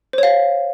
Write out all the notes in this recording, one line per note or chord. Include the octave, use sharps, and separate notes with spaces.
C5 C#5 F5